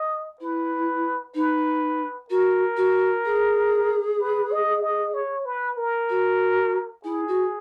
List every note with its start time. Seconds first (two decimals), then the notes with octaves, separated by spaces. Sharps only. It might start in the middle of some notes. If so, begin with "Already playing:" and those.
Already playing: D#5
0.41 E4 B4
1.35 D#4 B4
2.30 F#4 A#4
2.77 F#4
3.25 G#4
4.20 B4
4.52 D#5
4.82 D#5
5.14 C#5
5.45 B4
5.77 A#4
6.10 F#4
7.04 E4 G#4
7.28 F#4